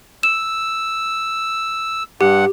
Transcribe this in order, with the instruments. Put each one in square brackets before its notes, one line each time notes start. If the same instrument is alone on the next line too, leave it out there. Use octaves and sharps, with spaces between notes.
[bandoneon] E6 [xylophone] E7
[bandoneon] G2 F#5 [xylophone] G4